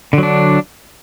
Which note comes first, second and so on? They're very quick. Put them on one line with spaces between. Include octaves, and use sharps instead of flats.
D3 F#3 D4